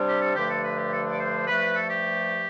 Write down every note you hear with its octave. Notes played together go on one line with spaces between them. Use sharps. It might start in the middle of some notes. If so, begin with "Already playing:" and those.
Already playing: C3 G3 D4
G4
A4
G2 D3 F3 A3 D4 G4
A4
B4
G4
A4
A4
D5
C5
G2 F3 A3 B4
A4
G4